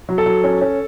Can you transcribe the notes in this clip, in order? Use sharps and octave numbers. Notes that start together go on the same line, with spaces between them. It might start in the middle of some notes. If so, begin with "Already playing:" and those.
F#3
A4
F#3
C#4
C#4